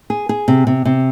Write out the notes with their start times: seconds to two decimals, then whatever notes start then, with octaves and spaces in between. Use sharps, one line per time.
0.10 G#4
0.29 G#4
0.48 C3
0.67 C3
0.85 C3